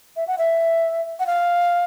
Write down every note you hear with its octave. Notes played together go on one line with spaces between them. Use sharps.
E5
F#5
E5
F#5
F5